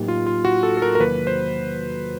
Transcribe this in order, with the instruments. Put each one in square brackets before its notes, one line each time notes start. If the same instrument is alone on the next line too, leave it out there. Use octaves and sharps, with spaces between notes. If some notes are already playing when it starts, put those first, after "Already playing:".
Already playing: [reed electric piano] A2 F#3 A#3 D#4 G4
[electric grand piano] F4
F4
F#4
A4
A4
A#4
A#4
[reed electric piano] E2 C3 D#3 F#3 A#3 [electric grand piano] B4
[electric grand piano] C5